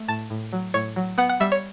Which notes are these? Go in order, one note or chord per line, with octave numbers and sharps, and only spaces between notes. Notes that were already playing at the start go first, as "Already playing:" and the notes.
Already playing: A3
A2 A5
A2
F#3
A2 C#5
F#3
B3 F#5
F#5
G3 E5
C#5